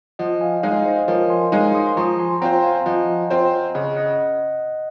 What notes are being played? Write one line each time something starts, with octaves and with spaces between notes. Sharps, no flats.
F3 D#5 F#5
F5 G#5
G#3 D#4 F5 G#5
C5 D#5
F3 A#4 C#5
G#5 C6
G#3 D#4 F5 G#5
C6 D#6
C6
F3 A#5 C#6
G#5 C6
C4 F4 C5 F#5 A#5
F5 G#5
F3 D#5 F#5
C4 F4 C5
C#3 D#5 F#5
D#5 F#5